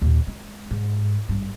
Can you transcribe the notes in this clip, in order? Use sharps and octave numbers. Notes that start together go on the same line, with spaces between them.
D#2 A#2
G#3
G#2
G#1 G2